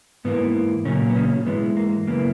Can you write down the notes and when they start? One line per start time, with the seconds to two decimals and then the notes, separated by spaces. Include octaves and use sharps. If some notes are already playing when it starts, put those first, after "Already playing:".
0.25 G#2 E3 A#3 B3
0.85 A#2 C#3 F#3 A#3 C#4
1.10 B3
1.16 C#3 C#4
1.46 G#2 E3 G#3 B3
1.77 A#3
2.07 F#2 C#3 E3 A#3 B3